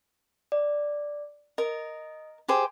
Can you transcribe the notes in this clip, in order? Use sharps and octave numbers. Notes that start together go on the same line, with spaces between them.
D5
A#4 D#5
G4 G#4 C5